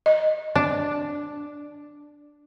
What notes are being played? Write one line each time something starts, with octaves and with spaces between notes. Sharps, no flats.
D#5
D4